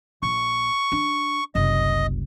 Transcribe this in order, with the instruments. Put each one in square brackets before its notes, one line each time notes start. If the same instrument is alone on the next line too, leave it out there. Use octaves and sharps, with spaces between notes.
[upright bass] A#1 [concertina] C#6
[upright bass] D4
[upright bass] F#1 C2 [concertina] D#5